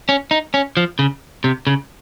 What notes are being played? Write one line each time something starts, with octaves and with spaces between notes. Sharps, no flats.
C#4
D#4
C#4
F3
C#3
C3
C#3